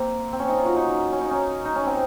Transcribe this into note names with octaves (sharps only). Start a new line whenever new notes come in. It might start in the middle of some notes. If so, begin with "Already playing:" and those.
Already playing: A#3 C4
C4
C#4
D#4
F4
F#4
D#4
C#4
D#4
C#4
D#4
C#4
C4